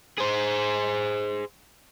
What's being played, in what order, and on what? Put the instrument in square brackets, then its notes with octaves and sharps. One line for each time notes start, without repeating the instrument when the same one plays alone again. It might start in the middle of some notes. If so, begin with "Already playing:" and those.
[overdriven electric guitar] G#4 C5